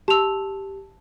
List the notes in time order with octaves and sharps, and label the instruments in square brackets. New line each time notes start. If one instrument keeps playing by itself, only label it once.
[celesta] G4 F7 [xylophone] A5 E6